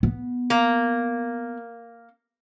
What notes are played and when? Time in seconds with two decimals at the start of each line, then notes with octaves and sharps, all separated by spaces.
0.03 B3
0.50 A#3